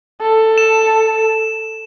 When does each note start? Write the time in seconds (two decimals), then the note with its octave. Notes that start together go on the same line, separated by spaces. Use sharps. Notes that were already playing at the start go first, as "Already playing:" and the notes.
0.21 A4
0.58 E7